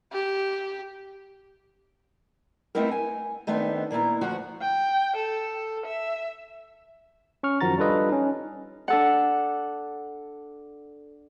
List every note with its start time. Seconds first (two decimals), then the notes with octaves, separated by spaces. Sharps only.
0.13 G4
2.75 A3 B3 C4 D#4 E4 A#4
2.91 G#5
3.47 D#3 A3 B3 C4 D4 D#4
3.91 A#2 A#3 B3 E4 A#5
4.21 D2 F3 F#4 F#5
4.61 G5
5.16 A4
5.85 E5
7.43 C#4 C#6 F6
7.61 F#2 D#3 F3 F#4 A#5 A6
7.78 G3 D4 F4 A4 B4 D#5
8.09 C#4 D#4
8.88 D4 A4 F#5